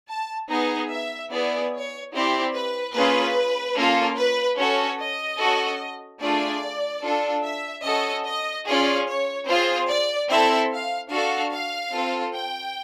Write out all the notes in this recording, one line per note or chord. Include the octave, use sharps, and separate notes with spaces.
A5
B3 D#4 G#4 A#5
E5
B3 E4 G#4 D5
C#5
C4 E4 G4 D5
B4
A#3 C#4 F4 G#4 B4
A#3 C#4 F4 A4
B4
C#4 F#4 A4 C#5
D#5
C#4 F#4 A4
A3 D4 F4 G#4 D5
D4 F4 A4
E5
C#4 F#4 A4 D#5
D#5
C#4 F4 G#4 D5
C#5
C4 F4 G#4 C5
D5
C4 E4 A4 E5
F5
D4 F#4 A4 F5
F5
C4 F4 A4
G5